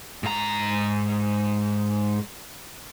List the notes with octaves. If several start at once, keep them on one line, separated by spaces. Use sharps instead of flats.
G#2 A#5